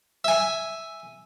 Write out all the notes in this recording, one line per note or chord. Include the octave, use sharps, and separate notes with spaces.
E5 G#5